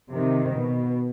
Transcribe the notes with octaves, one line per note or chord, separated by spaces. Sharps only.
C3 D#3
B2